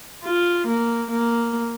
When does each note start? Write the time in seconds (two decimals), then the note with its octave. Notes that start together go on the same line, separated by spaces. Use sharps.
0.24 F4
0.68 A#3
1.11 A#3